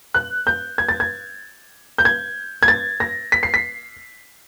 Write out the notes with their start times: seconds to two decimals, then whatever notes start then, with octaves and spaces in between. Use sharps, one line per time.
0.14 F#6
0.47 G6
0.78 G#6
0.89 A6
1.00 G#6
1.98 G6
2.05 G#6
2.63 G#6
2.68 A6
3.00 A#6
3.32 B6
3.43 C7
3.54 B6